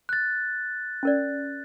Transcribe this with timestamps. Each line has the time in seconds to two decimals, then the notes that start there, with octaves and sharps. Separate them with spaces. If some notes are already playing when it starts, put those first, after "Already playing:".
0.09 F#6 A6
1.03 C#4 A#4 D5